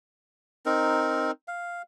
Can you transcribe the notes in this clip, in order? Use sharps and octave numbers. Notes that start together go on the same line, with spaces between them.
C4 D#4 A#4
F5